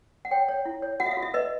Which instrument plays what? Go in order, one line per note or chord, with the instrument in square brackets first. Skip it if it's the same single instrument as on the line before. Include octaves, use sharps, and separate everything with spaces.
[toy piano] F#5
C#5 G5
C#5
E4
C#5
F#4 F#5
E5
F5
F#4
E5
B4 D#5